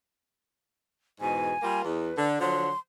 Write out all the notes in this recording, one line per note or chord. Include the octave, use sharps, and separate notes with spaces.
E2 G#2 B2 G#5
G3 A#3 F4
E2 B4
D3
D3 F3 F#3 C6